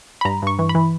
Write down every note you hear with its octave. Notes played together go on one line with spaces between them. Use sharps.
B5
G2 A#5
G2 C#6
E3
B5
E3